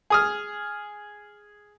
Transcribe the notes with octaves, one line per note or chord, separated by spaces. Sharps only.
G#4 D#6 F6